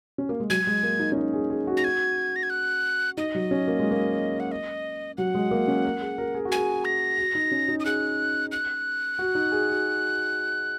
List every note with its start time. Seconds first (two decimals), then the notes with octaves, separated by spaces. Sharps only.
0.18 C#4
0.29 A#3
0.40 G#3
0.50 F#3 G#6
0.67 G#3
0.83 A#3
1.00 D#4
1.12 C#4
1.17 D#4
1.33 G#4
1.50 G#4
1.67 F#4
1.77 A#6
1.84 G#6
2.36 A#6
2.43 G#6
2.50 F#6
3.17 D#4 D#5
3.35 F#3
3.51 C#4
3.68 A#3
3.79 G#3
3.91 A#3
4.40 F#5
4.52 D#5
5.18 F#3 F#5
5.35 G#3
5.51 A#3
5.68 C#4
5.85 A#4
6.01 G#4
6.18 A#4
6.34 G#4
6.45 F#4
6.52 G#4 G#5
6.85 A#6
7.18 F#4
7.35 D#4
7.51 C#4
7.69 D#4
7.80 D#6
7.85 G#4 F#6
8.52 F#6
9.19 F#4
9.35 D#4
9.52 G#4
9.69 F#4